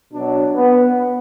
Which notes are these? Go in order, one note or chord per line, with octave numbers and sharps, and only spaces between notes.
B2 F#3 D4
B3